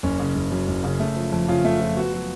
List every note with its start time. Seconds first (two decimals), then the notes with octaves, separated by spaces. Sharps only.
0.03 F#1 C#4
0.20 C#3
0.36 F#1
0.51 F#2
0.68 F#1
0.84 C#3
1.00 A3
1.16 F3
1.32 F2
1.48 C#3 F4
1.65 A3
1.81 F3
1.97 B3 F#4
2.13 F#3